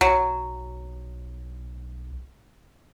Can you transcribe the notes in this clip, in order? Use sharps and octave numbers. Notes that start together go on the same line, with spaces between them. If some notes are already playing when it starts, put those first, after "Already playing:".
B1 F#3